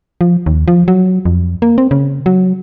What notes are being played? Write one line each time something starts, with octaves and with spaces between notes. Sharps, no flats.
F3
D#2
F3
F#3
F2
A#3
C4
C#3
F#3